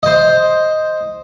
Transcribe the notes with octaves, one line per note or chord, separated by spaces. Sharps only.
C5 D#5